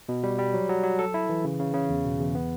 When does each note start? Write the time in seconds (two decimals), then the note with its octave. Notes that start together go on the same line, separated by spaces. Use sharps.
0.09 B2
0.23 G3
0.39 G3
0.54 F#3
0.69 F#3
0.84 F#3
0.99 A4
1.14 E4
1.29 E3
1.44 C#3
1.59 C#3
1.74 C#3
1.89 E2
2.04 B2
2.20 E2
2.35 B3